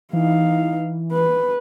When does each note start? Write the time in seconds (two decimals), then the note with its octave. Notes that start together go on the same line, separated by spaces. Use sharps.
0.13 E3 D#4 F5
1.12 B4